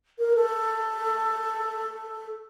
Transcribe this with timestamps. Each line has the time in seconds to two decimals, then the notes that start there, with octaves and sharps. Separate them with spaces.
0.18 A#4
0.35 A4